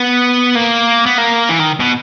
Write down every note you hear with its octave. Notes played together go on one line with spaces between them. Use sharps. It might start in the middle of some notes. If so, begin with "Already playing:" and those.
Already playing: B3
A#3
B3
A#3
E3
D#3
B2